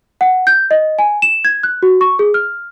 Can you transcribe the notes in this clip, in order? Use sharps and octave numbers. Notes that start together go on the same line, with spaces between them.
F#5
G6
D#5
G#5
E7
G#6
F#6
F#4
C#6
G#4
F6